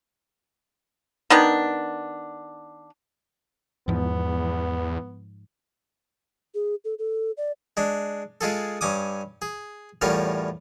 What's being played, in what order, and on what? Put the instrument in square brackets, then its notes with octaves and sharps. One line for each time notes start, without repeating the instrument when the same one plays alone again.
[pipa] D#3 B3 D4
[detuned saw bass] E2 [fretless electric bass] G#2 F3 [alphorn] B3
[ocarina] G#4
A4
A4
D5
[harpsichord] G#3 D4
G#3 F4 G#4 A4
G2 C#4 D6 D#6
G#4
E2 A2 G3 C#4 F4 A#4